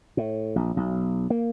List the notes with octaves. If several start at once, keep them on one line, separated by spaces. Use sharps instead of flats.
A2
A#1
B1
A#3